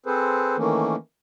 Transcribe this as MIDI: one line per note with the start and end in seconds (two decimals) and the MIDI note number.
0.06 0.56 60
0.06 0.56 68
0.06 0.56 69
0.06 0.56 71
0.06 0.56 72
0.57 0.96 51
0.57 0.96 52
0.57 0.96 57
0.57 0.96 58
0.57 0.96 61